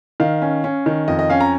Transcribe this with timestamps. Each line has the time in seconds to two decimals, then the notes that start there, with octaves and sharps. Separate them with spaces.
0.20 D#3 F5
0.42 C#4
0.64 C#4
0.86 D#3
1.08 F2 D#5
1.19 D#5
1.30 C#4 F5
1.41 A#5